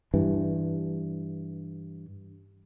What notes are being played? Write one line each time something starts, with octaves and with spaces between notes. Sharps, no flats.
G2 E3